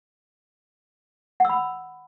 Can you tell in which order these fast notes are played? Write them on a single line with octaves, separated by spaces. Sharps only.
F#5 E6 B5